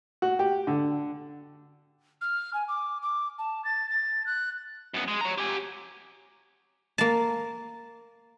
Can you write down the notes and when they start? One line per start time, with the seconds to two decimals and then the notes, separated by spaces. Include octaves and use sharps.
0.22 F#4
0.39 G4
0.67 D3
2.21 F6
2.54 G#5
2.68 D6
3.02 D6
3.39 A5
3.65 A6
3.89 A6
4.26 F#6
4.94 F#2 B3
5.08 G#3
5.21 C#5 A#5
5.38 G4 G#5
6.98 A#3 A5